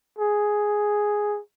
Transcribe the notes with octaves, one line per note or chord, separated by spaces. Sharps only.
G#4